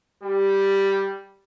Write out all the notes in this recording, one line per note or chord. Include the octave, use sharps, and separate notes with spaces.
G3 G4